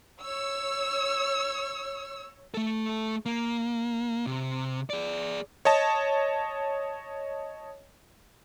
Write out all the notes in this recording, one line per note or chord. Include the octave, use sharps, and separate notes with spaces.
C#5 E6
A3 A4
A#3
C3
G#4 D5
C#5 D#5 A5